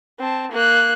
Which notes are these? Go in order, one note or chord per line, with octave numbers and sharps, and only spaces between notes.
C4 A5
A#3 F#6